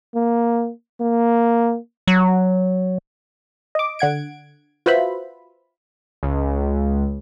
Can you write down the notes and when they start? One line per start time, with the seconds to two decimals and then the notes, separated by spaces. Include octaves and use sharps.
0.15 A#3
1.01 A#3
2.07 F#3
3.75 D#5 D6
3.99 D3 F#5 G#6 D7
4.86 F4 F#4 B4 C5 E5 B5
6.23 C#2